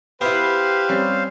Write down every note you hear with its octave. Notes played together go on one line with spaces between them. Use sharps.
B3 E4 G4 B4 C5 F5
G3 C4 C#4